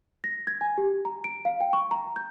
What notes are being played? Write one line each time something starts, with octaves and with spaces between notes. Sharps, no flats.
A#6
G#6
G#5
G4
A#5
D7
F5
G5
C#6
A#5
G6